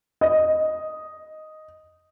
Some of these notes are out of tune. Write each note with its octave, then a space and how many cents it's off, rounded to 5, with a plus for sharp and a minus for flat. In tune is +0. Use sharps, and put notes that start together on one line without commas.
D#5 +0